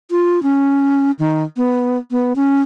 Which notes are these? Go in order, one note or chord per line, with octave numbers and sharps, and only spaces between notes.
F4
C#4
D#3
B3
B3
C#4